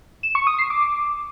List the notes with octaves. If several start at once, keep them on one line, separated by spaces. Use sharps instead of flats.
E7
C#6
D#6
C7
D6